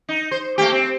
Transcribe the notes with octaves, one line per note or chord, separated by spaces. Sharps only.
D#4
C5
A3 A#3 G4
C4